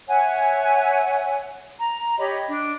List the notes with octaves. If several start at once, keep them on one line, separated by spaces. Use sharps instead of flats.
C#5 E5 F#5 G#5
A#5
G4 C#5 D#5 B5
D4